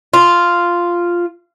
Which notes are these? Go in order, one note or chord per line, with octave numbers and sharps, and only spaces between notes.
F4